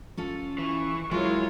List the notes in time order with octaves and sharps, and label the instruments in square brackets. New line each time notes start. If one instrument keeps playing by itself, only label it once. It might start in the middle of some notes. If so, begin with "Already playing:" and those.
[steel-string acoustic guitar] C#4 F4 A4
[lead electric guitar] E3 [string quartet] C#6
[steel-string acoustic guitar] F#3 [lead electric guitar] G#3 [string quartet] E4 A#4 C#5 [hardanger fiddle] F4